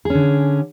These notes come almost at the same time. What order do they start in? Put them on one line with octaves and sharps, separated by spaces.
G#4 C#4 D3